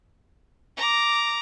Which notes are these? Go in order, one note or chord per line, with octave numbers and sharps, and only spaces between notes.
A#5 D6